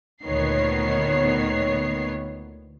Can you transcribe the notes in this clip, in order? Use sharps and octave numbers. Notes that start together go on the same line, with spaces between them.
D2 A#2 D#3 B3 C#5 C7